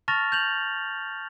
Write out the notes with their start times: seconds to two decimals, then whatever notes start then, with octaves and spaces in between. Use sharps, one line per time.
0.08 A5 C#6 F6 A6 A#6 F7
0.32 G6 F7 F#7